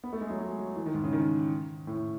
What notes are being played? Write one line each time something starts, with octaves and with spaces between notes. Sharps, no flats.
B3
A3
G#3
F#3
G#3
F#3
E3
D#3
G#2
C#3
D#3
A2